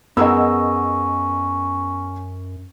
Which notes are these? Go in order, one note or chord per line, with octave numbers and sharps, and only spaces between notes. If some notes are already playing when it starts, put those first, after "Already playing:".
F#2 B3 C#4 G#4 A#4 D#5 F#5 E6